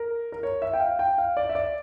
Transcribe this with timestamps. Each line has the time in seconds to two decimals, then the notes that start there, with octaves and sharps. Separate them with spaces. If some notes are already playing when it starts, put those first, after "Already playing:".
Already playing: A#4
0.32 A#4
0.43 C#5
0.62 E5
0.73 G5
0.80 F5
0.99 G5
1.18 F5
1.37 D5
1.49 E5
1.55 D5